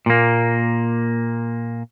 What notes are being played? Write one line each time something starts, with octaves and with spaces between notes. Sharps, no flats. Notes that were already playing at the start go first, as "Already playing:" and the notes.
A#2 A#3